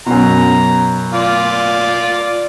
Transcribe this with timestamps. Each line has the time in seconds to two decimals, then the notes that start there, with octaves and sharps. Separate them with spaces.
0.06 F#2 B2 A#5
1.14 F4 D5